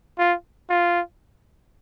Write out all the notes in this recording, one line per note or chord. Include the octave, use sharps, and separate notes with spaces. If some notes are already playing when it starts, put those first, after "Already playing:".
F4
F4